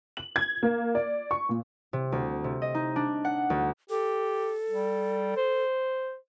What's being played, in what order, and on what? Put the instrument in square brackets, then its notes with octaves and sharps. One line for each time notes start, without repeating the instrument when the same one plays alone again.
[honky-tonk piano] F#7
G#6
A#3
D5
C#6
A#2
[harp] C3
D2
C3
D#5
D#4
D4
F#5
D2
[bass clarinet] G4 [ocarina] A4
[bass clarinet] G3
C5